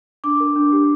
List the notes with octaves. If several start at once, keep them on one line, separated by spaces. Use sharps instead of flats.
D4 D6
A#4
D4
G4